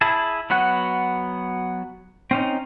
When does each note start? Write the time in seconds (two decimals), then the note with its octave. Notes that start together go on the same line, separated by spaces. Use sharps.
0.01 E4 G#4 A5
0.50 F#3 B3 F#4 F#5
2.31 C4 C#4 D#4